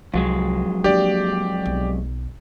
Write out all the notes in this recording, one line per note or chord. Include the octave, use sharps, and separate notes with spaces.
C2 F2 F#3 G#3
A#3 D4 G4 D5
B1